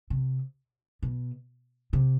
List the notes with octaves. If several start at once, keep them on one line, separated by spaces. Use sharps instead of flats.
C3
B2
C3